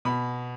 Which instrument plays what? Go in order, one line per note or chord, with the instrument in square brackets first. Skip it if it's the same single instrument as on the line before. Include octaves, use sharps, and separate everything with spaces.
[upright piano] B2 B5